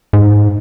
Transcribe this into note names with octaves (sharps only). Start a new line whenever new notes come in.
G#2